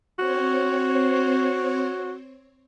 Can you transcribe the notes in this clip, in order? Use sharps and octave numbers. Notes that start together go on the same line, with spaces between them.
C4 F#4 C5 C#5